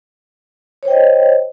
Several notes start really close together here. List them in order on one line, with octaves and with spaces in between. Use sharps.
C#5 C5 G5 D#5